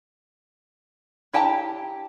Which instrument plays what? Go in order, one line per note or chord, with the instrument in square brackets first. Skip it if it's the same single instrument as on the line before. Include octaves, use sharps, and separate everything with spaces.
[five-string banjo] E4 G4 G5 A5 A#5